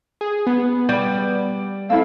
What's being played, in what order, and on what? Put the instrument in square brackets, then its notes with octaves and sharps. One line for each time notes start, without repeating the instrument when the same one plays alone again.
[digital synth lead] G#4
B3
[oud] G3 [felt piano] D5
[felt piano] A3 C4 E4 [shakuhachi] F5 [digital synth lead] E6